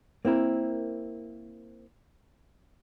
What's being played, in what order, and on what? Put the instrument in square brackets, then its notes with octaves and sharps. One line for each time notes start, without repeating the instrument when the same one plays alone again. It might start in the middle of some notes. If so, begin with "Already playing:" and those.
[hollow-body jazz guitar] A#3 C4 E4 A#4